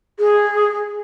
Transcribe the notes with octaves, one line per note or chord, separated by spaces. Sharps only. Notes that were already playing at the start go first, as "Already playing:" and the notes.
G#4